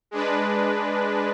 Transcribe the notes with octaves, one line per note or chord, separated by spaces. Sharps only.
G#3 D4 B4